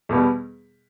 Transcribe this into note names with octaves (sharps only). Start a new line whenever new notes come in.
E2 B2 G3 B3